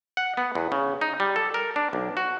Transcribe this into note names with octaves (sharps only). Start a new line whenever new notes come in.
F#5
B3
E2
C#3
D#4
G3
A4
A#4
D4
B1
F#4